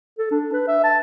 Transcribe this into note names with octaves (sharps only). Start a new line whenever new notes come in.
A4
D4
B4
E5
A5